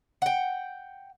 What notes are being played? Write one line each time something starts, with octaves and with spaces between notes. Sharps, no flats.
F#5 G5